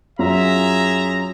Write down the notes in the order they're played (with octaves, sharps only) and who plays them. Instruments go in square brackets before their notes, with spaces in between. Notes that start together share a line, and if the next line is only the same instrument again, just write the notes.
[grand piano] F#2 F4 [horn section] G#4 A#5 [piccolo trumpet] E5